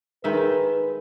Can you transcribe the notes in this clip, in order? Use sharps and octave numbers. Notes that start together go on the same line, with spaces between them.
D#3 G#3 B4 E5